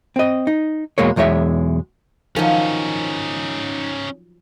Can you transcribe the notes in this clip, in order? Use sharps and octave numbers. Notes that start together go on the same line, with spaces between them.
C4 D#5
D#4
E2 B2 G#3 A#3 C#5
B1 E2 G#3 C#5 E5
D#3 F3 F#3 C#4 D#4